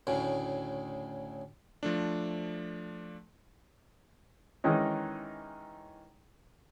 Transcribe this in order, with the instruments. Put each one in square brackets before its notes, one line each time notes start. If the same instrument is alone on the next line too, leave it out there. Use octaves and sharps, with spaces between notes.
[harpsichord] D2 A2 C#3
[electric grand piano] F3 A3 D4
[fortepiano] D#3 E3 G#3 C#4 D#4